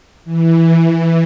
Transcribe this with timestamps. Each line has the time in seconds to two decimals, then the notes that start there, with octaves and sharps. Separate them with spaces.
0.25 E3